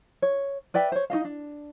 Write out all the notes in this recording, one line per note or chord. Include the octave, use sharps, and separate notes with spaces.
C#5
B4 D5 E5 G5
C5 C#5
D#4 F#4 D#5 F5
D4